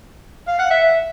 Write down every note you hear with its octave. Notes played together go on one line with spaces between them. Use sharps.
F5
F#5
E5